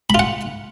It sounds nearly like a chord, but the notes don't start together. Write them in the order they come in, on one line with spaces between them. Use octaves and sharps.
B5 F4 F#5